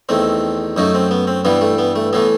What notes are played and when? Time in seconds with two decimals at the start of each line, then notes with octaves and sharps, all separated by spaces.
0.09 E2 D#3 A3 C4
0.77 F#2 F#3 A3 D#4
0.95 C4
1.11 B3
1.27 C4
1.45 G2 E3 G3 B3
1.61 A3
1.78 B3
1.96 A3
2.13 A2 E3 A3 B3